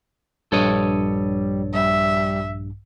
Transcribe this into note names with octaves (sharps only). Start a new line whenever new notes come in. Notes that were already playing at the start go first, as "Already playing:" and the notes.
A#1 G2 G3 A4 C#5 D#5
G3 E5